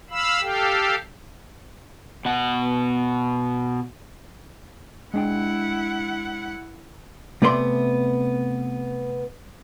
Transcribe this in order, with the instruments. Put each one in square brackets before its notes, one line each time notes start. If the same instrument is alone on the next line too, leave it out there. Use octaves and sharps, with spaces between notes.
[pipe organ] F5 B5 E6
G4 A4 F5 G5
[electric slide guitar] B2 F#5
[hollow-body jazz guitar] G#3 D4 G5 [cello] E4 F#5
[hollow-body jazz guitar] C3 A3 B3 D5 D#5 C6